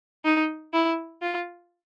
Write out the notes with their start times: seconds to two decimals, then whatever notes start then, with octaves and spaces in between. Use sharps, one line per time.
0.25 D#4
0.73 E4
1.22 F4